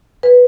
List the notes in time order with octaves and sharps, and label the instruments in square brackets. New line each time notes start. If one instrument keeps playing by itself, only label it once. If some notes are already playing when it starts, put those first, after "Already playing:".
[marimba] B4